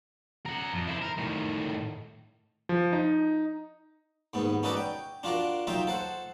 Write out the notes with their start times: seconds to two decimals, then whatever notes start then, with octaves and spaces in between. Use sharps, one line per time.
0.46 A#4 F#5
0.72 F2
0.87 E4 C5
1.02 A#4
1.18 A2 D#3
2.69 F3
2.93 D#4
4.34 D#2 G#2 B3
4.63 C#4 D#4 F#4 A4 B4 D5
4.77 G5
5.23 D4 F4 F#4 A#4
5.67 F#3 D#4 F4 E5 G5
5.87 A4 C5 F#5